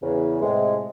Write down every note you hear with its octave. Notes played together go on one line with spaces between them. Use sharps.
E2 C#3
A2 C3 G#3